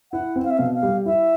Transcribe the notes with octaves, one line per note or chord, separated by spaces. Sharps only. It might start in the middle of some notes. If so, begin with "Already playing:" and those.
E4 F#5
C4
F5
E5
B2 F5
F5
G3
E4 E5